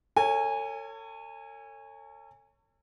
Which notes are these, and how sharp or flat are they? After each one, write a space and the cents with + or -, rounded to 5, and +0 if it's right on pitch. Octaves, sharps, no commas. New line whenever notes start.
A4 +40 C#5 +0 G#5 -15